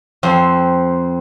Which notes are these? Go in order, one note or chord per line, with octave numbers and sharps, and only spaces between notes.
F2 C4